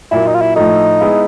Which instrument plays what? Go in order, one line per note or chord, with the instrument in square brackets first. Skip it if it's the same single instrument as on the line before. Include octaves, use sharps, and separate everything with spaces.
[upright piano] A#2 F#3 A#3 [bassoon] E4
[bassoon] D#4
F4
E4
[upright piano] A2 F3 A3 [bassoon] D#4
[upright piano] G#3 B3 E4 G#4